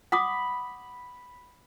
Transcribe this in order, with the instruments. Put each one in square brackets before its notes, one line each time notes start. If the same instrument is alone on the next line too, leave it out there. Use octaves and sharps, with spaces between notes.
[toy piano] F#5 D6 D#6 [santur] B5